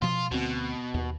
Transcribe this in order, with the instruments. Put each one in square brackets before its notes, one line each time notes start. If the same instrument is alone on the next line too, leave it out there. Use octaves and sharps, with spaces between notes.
[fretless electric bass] B2 F3 [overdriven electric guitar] F4
[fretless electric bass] D2 C4 [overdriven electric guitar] B2
[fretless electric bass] D#2